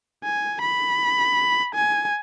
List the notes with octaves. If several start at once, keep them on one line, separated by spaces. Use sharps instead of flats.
G#5
B5
G#5